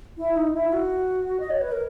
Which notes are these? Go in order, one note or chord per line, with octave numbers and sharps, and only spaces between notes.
E4
D#4
E4
F#4
D#5
C#5
B4
A#4